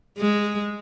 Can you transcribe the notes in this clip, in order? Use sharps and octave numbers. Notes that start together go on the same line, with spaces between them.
G#3